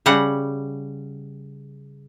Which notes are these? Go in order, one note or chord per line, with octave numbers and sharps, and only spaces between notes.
C#3 G3 F#5